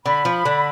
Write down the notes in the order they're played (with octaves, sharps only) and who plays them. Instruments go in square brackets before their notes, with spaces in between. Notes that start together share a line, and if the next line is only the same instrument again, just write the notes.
[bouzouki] D3 [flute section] B5
[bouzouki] F3
D3